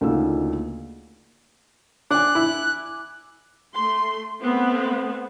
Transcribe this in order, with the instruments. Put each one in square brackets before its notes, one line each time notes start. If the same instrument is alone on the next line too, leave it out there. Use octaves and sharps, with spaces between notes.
[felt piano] D2 C#3 A#3 D#4 F4 E6
[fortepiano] D4 [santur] G#5 D6 [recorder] F#6
[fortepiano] E4
[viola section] A3 C6
A3 B3 C4